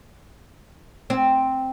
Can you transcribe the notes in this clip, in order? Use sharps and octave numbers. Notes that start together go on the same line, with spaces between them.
C4